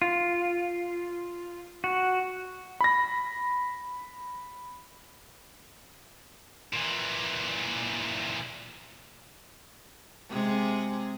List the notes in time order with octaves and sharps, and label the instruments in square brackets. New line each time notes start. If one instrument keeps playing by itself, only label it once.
[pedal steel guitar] F4
F#4
[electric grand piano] B5 A#6
[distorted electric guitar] A#2 E3
[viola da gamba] C3 G#3 G#4